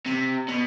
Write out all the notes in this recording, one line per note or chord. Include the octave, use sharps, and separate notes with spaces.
C3
B2